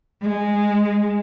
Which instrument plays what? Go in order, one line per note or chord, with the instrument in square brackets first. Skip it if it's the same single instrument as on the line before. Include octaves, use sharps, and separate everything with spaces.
[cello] G#3